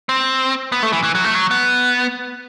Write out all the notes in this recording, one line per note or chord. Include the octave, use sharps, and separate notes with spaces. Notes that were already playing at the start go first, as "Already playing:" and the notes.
C4
B3
A3
E3
E3
F#3
A3
F#3
B3